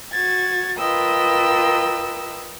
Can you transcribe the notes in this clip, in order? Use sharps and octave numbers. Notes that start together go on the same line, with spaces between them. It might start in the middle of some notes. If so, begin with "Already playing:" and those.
F#4 G#6 A6
F4 A#4 B4 D#5 G5 E6